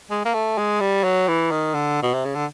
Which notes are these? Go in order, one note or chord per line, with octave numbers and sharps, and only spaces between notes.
G#3
A#3
A3
G#3
G3
F#3
E3
D#3
D3
B2
C3
C#3
D3